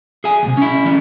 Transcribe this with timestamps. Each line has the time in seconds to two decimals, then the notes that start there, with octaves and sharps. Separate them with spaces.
0.24 G#4 E5 G#5
0.43 D#2 C3
0.57 C#4 E4
0.85 E3 C#4